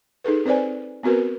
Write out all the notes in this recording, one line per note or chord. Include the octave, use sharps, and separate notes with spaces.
D#4 G#4 A4 B4
C4 B4 C5 D5 G#5
B3 C4 F#4 A#4 B4